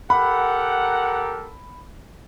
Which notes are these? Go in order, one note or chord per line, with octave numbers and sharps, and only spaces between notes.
G4 A4 A#4 F#5 B5